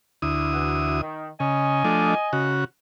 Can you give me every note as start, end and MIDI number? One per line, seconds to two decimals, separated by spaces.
0.22 1.01 38
0.22 1.01 64
0.22 1.01 87
0.54 0.98 52
0.54 0.98 66
1.01 1.29 51
1.40 1.83 49
1.40 2.56 75
1.40 2.56 80
1.84 2.15 53
1.84 2.15 57
1.84 2.15 62
2.33 2.64 49
2.33 2.64 66